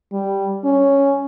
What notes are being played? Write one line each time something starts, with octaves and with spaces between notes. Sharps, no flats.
G3
C#4